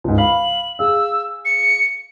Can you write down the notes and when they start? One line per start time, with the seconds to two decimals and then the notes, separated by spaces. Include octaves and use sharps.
0.04 C#2 G#2
0.18 F5 B5 F#7
0.79 G#4 F5 E6
1.45 C#7